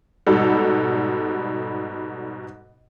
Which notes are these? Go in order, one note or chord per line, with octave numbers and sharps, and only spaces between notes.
G#2 B2 G3 A4